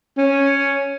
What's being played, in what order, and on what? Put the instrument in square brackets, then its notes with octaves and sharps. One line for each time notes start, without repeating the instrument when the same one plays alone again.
[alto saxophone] C#4